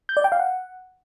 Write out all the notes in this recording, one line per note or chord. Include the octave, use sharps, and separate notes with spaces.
G6
D5
G5
F5
F#5